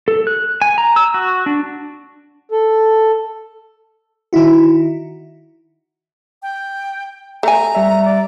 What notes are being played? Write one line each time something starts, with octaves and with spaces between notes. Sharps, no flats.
A4
F#6
G#5
A#5
E6
F#4
D4
A4
D#3 D#4 E4 F#4
G5
A3 G#5 A#5
G3 E5
D5